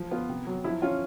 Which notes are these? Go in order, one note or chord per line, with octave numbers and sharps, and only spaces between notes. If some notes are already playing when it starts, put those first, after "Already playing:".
Already playing: F3
B3 F4
C3
F#3
F3 E4
C#4 F4